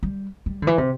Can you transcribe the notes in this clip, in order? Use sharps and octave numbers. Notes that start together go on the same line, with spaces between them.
G3
G3
D3
E3
C3